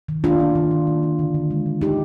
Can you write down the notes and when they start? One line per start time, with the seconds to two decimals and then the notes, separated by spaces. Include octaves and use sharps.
0.09 D#3
0.24 A#3 D4 F4
0.40 A#3
0.55 D#3
0.71 D#3
0.87 A#3
1.03 A#3
1.19 D3
1.34 D3
1.51 G#3
1.66 G#3
1.81 D3 D#4 G4